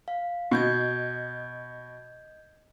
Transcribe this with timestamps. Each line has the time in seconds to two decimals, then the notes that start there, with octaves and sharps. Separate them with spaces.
0.08 F5
0.51 B2 D#5 G6 G#6